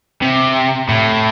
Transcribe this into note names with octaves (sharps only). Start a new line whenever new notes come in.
C3
A2